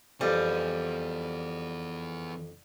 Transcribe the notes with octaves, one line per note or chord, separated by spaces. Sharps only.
F2 E3 G3 B3